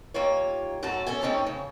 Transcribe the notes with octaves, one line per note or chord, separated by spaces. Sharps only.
D#2 A#3 F4 C#5
F#2 F#3 A3 F#4 A5
E2 C#4 A4 G#5
A3 C4 C#4 D#4 C#5 A5
C#3